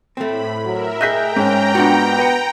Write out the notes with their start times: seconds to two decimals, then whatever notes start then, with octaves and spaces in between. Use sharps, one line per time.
0.17 A2 A3 C4 B5
0.65 F#3 A#4 E5
1.01 G#4 D#5 E5 G5 A#5 F#6 G6 B6
1.36 G#2 C#4
1.75 B3 D4 F4 F#4
2.19 B4 C#7